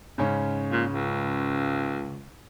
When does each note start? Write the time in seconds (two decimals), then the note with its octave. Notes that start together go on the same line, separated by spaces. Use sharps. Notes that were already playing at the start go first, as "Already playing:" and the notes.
0.18 G#2 C#3 C#4
0.72 A#2
0.90 C#2